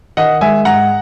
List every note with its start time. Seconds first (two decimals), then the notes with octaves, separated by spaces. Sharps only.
0.17 D#3 D#5 F#5
0.41 G#3 E5 G#5
0.65 G#2 F#5 A#5